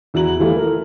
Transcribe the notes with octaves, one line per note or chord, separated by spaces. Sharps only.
E2 E4 F#4 A#5 F#7
E3 G3 A3 E4 F4
A4 A#4